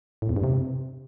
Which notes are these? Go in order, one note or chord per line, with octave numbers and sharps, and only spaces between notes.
A2
E2
G2
C3